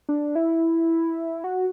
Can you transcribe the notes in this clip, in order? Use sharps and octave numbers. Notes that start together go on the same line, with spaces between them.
D4
E4
F#4